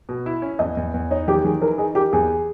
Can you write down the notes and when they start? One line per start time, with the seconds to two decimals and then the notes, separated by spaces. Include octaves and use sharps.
0.09 B2
0.26 E4
0.42 C#4
0.59 E2 D#5
0.77 E2
0.94 E2
1.11 D#4 C#5
1.28 D#3 G4
1.45 D#3 G#4
1.62 E3 A#4
1.78 D#4 G#4
1.95 G4 A#4
2.13 E2 G#4